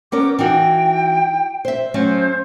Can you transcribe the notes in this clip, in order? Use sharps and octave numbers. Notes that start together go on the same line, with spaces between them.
B3 C#4 A#4 D6
E3 D#4 F#4 G5
C5 E5
F#3 A3 C#4 C5